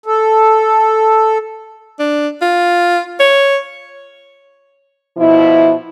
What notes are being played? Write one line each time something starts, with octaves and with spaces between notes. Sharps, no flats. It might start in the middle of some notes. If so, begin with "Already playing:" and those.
A4
D4
F4
C#5
B2 F3 E4